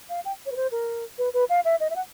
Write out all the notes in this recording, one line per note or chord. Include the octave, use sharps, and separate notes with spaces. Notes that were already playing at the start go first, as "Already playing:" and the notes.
F5
G5
C#5
B4
C5
A#4
B4
B4
F5
E5
D#5
E5
F#5